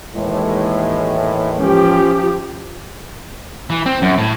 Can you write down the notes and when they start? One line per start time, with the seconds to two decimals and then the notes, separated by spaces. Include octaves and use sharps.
0.15 D#2 A2 E3 G#3
1.59 F3 C#4 G4
3.70 E3
3.86 C4
4.02 F#2
4.18 A2